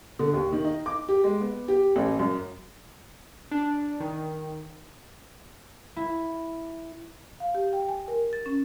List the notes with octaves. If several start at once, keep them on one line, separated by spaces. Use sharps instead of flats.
D3
D#2
D#3
D#4
D6
G4
G#3
B3
G4
A1
F#2
D4
D#3
E4
F5
G4
G5
G#5
A#4
A6
C#4